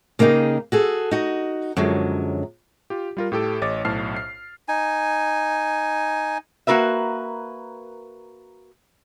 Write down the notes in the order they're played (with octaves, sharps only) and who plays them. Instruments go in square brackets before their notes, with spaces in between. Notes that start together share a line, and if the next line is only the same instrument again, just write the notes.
[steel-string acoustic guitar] C#3 A#3 B3 D#4 G4 G#4
F#4 G#4 A4
D#4 F#4
F#2 D3 F3 F#3 G#3
[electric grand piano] F4 G4
G3 F4 A#4
A2 G4 A4 D7
A1 C#5 D#5 D6 A6
B1 A2 C5 A5 F6 C7
C7
[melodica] D#4 G#5
[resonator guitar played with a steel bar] A#3 F#4 A#4 B4 E5